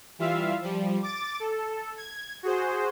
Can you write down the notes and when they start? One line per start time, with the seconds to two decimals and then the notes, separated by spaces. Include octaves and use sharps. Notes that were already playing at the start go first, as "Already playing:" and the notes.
0.19 E3 G3 F4 E5 F5
0.62 F3 G3
1.03 D6 A6
1.40 A4
1.97 G#6
2.43 F#4 G#4 C5